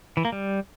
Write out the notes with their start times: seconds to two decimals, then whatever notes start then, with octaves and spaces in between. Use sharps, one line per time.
0.17 E3
0.25 A#3
0.32 G3